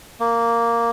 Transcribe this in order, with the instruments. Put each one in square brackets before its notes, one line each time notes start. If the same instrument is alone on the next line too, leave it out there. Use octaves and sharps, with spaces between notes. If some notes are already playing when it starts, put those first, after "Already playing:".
[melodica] A#3